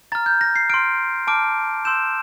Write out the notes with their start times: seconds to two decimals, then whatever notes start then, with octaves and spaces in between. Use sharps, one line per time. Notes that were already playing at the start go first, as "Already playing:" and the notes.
0.12 A#5 F6 A6
0.26 G6
0.41 A#6
0.56 C7
0.70 C6 F6 D7
1.27 A5 D6 F6 D7
1.85 C6 E6 G6 E7